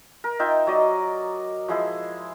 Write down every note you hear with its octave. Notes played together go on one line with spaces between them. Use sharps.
A#4
D#4 F4 E5 G5
F#3 D5 D#5
F3 G#3 E4